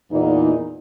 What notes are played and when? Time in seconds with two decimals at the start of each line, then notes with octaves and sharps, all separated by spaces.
0.11 E2 A#2 D#4